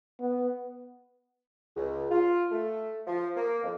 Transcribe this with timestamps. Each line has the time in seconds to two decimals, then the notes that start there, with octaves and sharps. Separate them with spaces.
0.20 B3
1.77 C#2
2.11 F4
2.51 A3
3.07 F3
3.36 A#3
3.63 F2